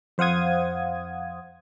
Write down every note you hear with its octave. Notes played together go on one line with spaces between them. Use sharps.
F2 C5 F5 F#5 D#6 G#6